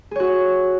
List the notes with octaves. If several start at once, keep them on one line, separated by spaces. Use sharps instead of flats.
F#4 G#4 C#5